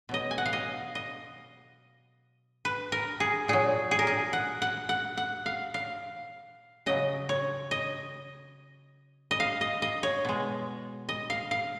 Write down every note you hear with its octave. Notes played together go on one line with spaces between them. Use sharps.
B2 F#3 D#5
G#5
F#5
F5
D#5
D#5
B4
A#4
G#4
A#2 F#3 G#4
G#4
A#4
G#4
F#5
F#5
F#5
F#5
F5
F5
C#3 F#3 D#5
C#5
D#5
D#5
F5
D#5
D#5
C#5
B2 G#3
D#5
F5
F5